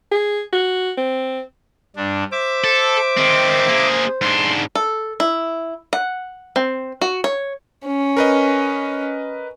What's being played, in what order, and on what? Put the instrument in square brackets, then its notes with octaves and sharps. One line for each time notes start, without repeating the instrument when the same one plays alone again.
[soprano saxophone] G#4
F#4
C4
[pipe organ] G2 D4
[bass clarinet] C5 [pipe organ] E5 D6
[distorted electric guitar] A4
D#3 C4
A#3 G#4
[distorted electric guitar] G#2 D4 [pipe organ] C6
[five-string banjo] A4
E4
F#5
C4
F#4
C#5
[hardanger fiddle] C#4
[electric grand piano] A#4 B4 D#5